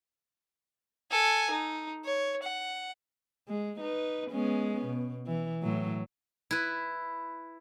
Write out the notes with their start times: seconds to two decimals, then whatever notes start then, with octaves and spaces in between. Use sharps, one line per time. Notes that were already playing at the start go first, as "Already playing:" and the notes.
1.11 A4 G#5
1.51 D#4
2.04 C#5
2.43 F#5
3.48 G#3
3.80 D#4 B4
4.31 G#3 B3 C#4
4.86 B2
5.27 E3
5.62 A2 F#3
6.51 E4 B4